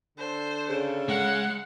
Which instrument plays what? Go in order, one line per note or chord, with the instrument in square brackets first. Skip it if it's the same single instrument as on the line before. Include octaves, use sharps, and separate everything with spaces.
[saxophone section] D3 A4 [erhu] C5
[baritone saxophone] C#3
[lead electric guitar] G#3 [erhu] F#5